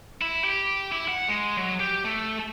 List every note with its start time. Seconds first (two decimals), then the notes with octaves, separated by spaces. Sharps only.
0.22 E4
0.44 G4
0.92 E4
1.08 F#5
1.29 G#3
1.57 F#3
1.80 G4
2.04 A3